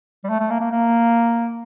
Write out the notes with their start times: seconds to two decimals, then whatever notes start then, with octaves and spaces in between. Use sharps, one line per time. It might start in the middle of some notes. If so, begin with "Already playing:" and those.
0.24 G3
0.29 A3
0.40 A3
0.50 A#3
0.61 A#3
0.71 A#3